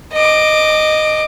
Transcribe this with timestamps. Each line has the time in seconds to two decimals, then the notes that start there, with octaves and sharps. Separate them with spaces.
0.13 D#5 D6